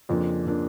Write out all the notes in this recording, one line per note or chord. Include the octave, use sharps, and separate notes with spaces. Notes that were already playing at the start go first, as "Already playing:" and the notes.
F2 C#3 F3 A#3 D4
C#3 F3 A#3 D4